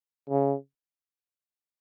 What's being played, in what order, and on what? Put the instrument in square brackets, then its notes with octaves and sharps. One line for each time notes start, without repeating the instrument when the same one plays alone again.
[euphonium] C#3